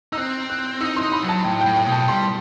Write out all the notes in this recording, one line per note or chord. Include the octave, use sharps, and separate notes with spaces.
D#4 E6
C4 F#6
F#6
D#4 E6
C6
D#4
B5
F#3
A5
A2 G5
G5
A2
G5
B2
A5
G3 C6